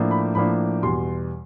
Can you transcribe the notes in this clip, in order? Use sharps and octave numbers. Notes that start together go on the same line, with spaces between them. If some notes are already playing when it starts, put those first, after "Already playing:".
Already playing: A2 F3 A#3 D4
B5
A2 F3 A#3 D4 B5
E2 B2 G3 C6